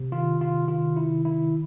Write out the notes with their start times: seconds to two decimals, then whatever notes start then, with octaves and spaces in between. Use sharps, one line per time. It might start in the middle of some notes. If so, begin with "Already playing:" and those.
Already playing: C3
0.12 D#3 F4
0.41 C3 F4
0.68 D#3 F4
0.96 C3 E4
1.25 D#3 E4